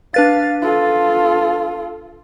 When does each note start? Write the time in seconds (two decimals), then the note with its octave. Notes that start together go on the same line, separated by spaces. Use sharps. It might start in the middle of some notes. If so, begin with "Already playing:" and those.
0.14 D4 B4 F5 A6
0.62 F4 A4